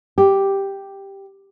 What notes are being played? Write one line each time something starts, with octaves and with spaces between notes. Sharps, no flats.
G4